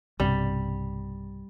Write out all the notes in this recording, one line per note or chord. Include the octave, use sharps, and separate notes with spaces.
B1 G2 C3 G3